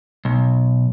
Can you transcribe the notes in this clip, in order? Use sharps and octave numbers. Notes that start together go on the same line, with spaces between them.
B1